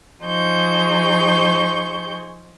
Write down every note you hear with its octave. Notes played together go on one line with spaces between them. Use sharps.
F3 D#4 G#4 C5 C#6 G6